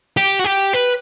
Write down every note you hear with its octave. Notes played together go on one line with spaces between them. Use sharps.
G4
F#4
G4
B4